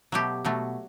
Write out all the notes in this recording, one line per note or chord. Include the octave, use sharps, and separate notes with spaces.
B2 F#3 A3 G4
B2 F#3 A3